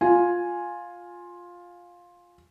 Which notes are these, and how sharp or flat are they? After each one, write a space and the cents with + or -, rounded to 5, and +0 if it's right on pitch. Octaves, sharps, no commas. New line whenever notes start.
F4 +10 G#5 +0